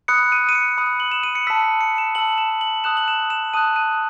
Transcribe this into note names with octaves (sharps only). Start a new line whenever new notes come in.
B5 D#6 F#6 C#7
D#7
D#7
C#7
B5 D#6 F#6
F#7
E7
D#7
C#7
A5 E6 B6
C#7
C#7
E7
A5 E6 F#7
E7
F#7
A5 D#6 F#6 E7
F#7
E7
E7
A5 D#6 F#6 D#7
D#7